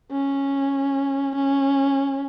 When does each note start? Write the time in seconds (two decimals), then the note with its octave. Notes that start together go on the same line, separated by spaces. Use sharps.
0.12 C#4
1.36 C#4